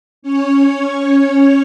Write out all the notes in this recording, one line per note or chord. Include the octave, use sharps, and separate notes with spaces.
C#4 C#5